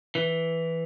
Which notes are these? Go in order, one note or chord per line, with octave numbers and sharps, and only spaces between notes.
E3